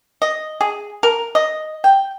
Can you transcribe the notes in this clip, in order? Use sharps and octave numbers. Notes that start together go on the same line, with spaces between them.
D#5
G#4
A#4
D#5
G5